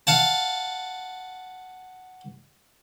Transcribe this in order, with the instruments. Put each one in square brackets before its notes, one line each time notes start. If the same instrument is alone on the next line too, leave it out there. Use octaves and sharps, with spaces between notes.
[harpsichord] F5 F#5 A5